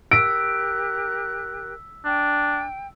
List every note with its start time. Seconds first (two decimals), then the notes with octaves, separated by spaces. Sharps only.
0.11 G4 A#4 E6 F#6 B6 D7
2.05 D4 G5